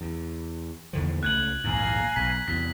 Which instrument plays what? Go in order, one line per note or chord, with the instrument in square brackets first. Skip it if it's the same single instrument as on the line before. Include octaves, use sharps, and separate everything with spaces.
[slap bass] E2
E2 D3 F3
[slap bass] C#2 A3 [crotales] F#6 G#6 F#7
[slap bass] A#1 D#2 G#2 [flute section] F5 G#5 A#5
[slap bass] B1 [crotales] B6
[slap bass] E2 C3 [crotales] B6